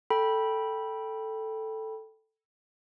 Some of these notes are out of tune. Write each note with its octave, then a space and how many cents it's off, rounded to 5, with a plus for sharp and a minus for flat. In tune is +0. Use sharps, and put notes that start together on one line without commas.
A4 +5 G5 +0 B5 -15